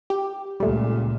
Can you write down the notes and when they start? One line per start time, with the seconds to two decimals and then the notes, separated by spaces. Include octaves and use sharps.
0.10 G4
0.60 C#2 A#2 G3 A3